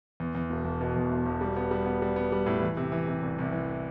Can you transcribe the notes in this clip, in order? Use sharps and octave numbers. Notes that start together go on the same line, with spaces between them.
E2
E2
E1
E1
B2
E2
E1
E1
G3
B3
G3
B3
G3
B3
G3
A2
E3
C3
E3
C3
C2
C2
E3